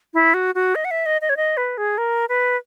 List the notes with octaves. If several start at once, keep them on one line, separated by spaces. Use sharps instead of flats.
E4
F#4
F#4
D#5
F#5
E5
D#5
D#5
C#5
D#5
B4
G#4
A#4
B4